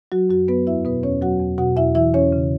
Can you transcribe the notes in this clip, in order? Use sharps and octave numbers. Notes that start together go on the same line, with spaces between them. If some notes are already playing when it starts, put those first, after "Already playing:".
F#3 F#4
F#2 F#4
F#3 B3 B4
E2 E4 E5
B2 B3 B4
E2 C#4 C#5
F#3 F#4 F#5
E2
B2 F#4 F#5
E2 E4 E5
E3 E4 E5
E2 C#4 C#5
C#3